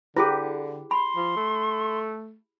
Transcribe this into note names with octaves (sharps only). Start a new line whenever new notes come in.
D3 E4 G4 G#4 B4
B5 C6
F3
A3